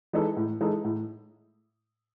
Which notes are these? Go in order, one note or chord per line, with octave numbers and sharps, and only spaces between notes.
E3 G#3 D#4 A4
A2
E3 G#3 D#4 A4
A2